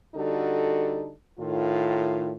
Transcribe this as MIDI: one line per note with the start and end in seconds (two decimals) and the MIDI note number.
0.15 1.10 50
0.15 1.10 55
0.15 1.10 63
0.15 1.10 66
0.15 1.10 69
1.39 2.33 45
1.39 2.33 51
1.39 2.33 65